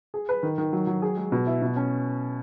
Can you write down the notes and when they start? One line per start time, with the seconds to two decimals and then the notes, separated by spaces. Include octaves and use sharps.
0.14 G#4
0.29 B4
0.43 D#3
0.58 D#3
0.73 F#3
0.87 F#3
1.02 G#4
1.17 G#3
1.32 B2
1.47 E4
1.62 B2
1.76 C#4